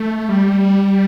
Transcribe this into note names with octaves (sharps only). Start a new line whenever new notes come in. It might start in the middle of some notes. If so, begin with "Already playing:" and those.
Already playing: A3
G3